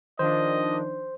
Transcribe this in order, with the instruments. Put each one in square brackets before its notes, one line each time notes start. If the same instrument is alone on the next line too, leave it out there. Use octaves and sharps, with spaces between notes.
[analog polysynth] D#3 F3 D4 [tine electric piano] C5 [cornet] D#5